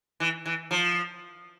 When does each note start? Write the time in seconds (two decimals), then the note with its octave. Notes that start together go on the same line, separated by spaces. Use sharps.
0.20 E3
0.46 E3
0.71 F3